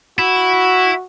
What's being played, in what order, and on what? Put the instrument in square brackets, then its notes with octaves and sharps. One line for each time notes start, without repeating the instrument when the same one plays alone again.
[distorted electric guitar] E4 [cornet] F#4